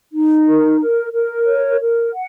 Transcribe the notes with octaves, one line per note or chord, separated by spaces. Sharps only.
D#4
A#4
A#4
A#4
C#5
A#4
F#5